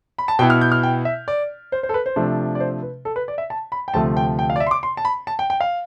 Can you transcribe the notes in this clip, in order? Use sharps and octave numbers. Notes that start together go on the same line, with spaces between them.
B5
A5
B2 B3 E4 G5
F6
G6
F6
G5
E5
D5
C5
C5
A4
B4
C5
C3 F3 A3 D4
D5
C5
B4
A4
B4
D5
E5
A5
B5
G5
D2 C3 F3 A3 A5
G5
G5
F5
D5
E5
C6
D6
C6
A5
B5
A5
G5
G5
F5